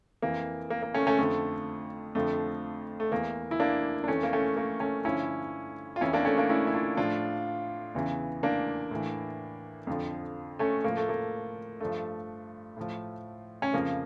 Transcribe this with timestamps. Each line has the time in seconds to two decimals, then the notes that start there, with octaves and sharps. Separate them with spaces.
0.22 F2 E3 A#3
0.70 A#3
0.83 A#3
0.94 A3 C#4
1.07 A3 C#4
1.18 F2 D3 F3 A3
2.15 F2 D3 F3 A3
3.00 A3
3.12 E2 E3 A#3
3.51 E4
3.60 A#3 D4
4.04 D4
4.08 F2 E3 A3 C#4
4.23 A#3
4.33 A3 C#4
4.57 A#3
4.80 A3 C#4
5.05 G2 D3 F3 C#4 E4
5.96 F4
6.01 F2 E3 C#4 E4
6.13 A#3 D4
6.25 A3 C#4
6.38 A#3 D4
6.49 C#4 E4
6.67 E4
6.74 D4 F4
6.97 A2 F3 D4 F4
7.95 E2 C#3 E3
8.43 A#3 D4
8.91 A2 E3
9.87 F2 D3 F3
10.59 A3 C#4
10.84 A2 F3 A#3
10.97 A3
11.09 A#3
11.80 G2 F3 A3
12.77 A2 F3
13.62 C#4
13.74 F2 C#3 F3 A#3